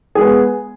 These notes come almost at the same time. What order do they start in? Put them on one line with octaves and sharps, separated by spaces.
G#4 G#3 B3